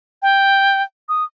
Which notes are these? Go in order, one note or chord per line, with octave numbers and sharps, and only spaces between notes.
G5
D#6